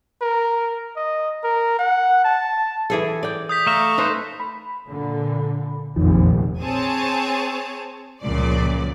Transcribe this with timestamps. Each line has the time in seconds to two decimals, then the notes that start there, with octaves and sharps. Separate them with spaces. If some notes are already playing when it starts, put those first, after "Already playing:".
0.22 A#4
0.96 D#5
1.44 A#4
1.79 F#5
2.24 A5
2.90 E3 G#4 A4
3.23 D5 G5
3.49 D#6 G6 B6
3.67 A3 E5 F5 A#5 C#6
3.98 D#4 A4 B4 C5 D#5
4.40 B5
4.88 A#2 D3
5.96 F1 A#1 E2 D#3 F3
6.61 C4 G#4 C#5 G#5 A5
8.23 C#2 F#2 A#2 C#3 F3 D5